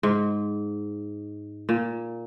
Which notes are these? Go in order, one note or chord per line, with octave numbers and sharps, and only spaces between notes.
G#2
A#2